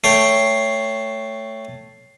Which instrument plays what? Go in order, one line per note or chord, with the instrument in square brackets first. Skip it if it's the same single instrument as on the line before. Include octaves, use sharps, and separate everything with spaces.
[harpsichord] A3 C#5 G5 [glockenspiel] C7